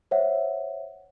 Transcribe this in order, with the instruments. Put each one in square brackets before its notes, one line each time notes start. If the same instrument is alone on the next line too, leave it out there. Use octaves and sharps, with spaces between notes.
[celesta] C5 C#5 E5 F#5